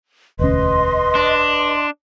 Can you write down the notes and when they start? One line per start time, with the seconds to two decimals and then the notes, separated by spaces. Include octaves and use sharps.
0.39 E1 D2 C#4 B4 D#5 C6
1.15 D4